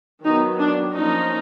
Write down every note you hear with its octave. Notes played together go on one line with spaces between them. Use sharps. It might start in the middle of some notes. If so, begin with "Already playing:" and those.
D#3 F#3 B3 D#4
D4
F3 A#3 C#4 D#4